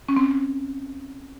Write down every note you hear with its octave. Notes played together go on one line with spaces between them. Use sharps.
C#4
C4